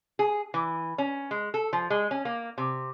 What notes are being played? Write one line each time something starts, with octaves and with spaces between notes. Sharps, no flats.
G#4
E3
C#4
G#3
A4
F3
G#3
C#4
A#3
C3